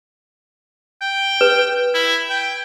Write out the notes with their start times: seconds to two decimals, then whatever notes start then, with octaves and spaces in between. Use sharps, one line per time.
1.01 G5
1.41 B4
1.94 E4
2.30 G5